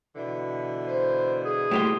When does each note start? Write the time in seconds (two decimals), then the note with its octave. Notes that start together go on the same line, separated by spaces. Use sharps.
0.15 B2 D3 E3
0.87 C5
1.45 G#4
1.71 A2 G4 C6